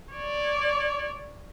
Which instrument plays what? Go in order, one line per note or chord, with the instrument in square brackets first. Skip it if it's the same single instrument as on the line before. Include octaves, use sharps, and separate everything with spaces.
[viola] C#5 D5